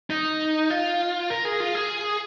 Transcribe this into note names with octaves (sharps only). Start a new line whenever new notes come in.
D#4
F4
A#4
G#4
F4
G#4